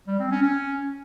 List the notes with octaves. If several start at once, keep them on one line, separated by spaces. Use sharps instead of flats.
G3
C4
C#4
C#4